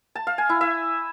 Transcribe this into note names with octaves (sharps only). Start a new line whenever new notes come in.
A5
F5
G#5
E4
E5